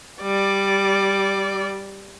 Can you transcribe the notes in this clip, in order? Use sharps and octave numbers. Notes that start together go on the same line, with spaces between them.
G3 D5